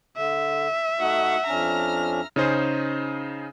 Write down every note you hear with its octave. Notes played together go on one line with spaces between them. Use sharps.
D3 E5
A3 D#4 F#4 F#5
F2 C#4 D4 A#5 F6
C#3 C#4 D#4 G#4 C5